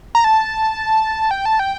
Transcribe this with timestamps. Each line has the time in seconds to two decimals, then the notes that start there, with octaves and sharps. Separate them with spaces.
0.15 A#5
0.24 A5
1.31 G5
1.45 A5
1.59 G5